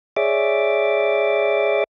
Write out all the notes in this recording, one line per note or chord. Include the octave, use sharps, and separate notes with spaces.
G#4 C#5 D5 E5 D6